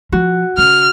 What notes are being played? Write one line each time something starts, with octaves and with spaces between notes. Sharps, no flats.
F3 F#4
C#3 F6